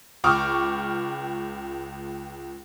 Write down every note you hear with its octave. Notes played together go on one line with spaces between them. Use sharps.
C#2 G5 C#6 D6 F6